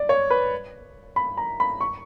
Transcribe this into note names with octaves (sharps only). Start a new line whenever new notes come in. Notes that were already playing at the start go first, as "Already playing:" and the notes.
Already playing: D5
C#5
B4
B5
A#5
B5
C#6